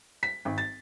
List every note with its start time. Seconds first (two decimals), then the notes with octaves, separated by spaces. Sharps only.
0.23 B6
0.45 G#1
0.58 A6